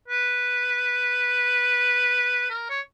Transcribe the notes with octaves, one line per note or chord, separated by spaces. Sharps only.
B4
A#4
C#5